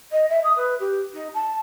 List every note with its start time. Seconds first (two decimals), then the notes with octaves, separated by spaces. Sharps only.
0.12 D#5
0.29 E5
0.43 D#6
0.56 B4
0.80 G4
1.13 D#4
1.34 A5